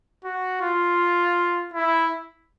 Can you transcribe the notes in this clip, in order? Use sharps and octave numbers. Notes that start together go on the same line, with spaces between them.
F#4
F4
E4